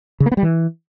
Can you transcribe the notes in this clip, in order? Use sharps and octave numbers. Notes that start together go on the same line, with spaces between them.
C#3
A#3
B3
G3
E3